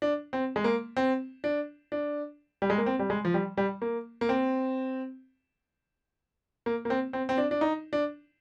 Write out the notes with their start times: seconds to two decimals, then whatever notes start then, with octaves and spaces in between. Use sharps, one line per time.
0.02 D4
0.33 C4
0.56 G#3
0.64 A#3
0.97 C4
1.44 D4
1.92 D4
2.62 G3
2.70 G#3
2.78 A#3
2.86 C4
2.99 G3
3.10 G#3
3.25 F3
3.34 G3
3.57 G3
3.82 A#3
4.21 A#3
4.29 C4
6.66 A#3
6.85 A#3
6.90 C4
7.13 C4
7.29 C4
7.38 D4
7.51 D4
7.61 D#4
7.93 D4